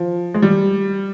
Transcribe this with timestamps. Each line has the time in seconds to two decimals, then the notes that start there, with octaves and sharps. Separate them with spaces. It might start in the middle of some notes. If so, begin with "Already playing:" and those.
Already playing: F3
0.34 G#3
0.42 G3